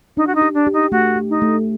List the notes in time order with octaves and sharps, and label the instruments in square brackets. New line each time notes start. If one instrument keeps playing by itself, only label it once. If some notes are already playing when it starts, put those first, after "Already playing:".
[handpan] D4 [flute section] D#4
[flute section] F#4
D#4
[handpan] G4
[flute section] D4
[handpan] G4
[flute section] D#4
[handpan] A3 [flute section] F#4
[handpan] G4
[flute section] D#4
[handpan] A3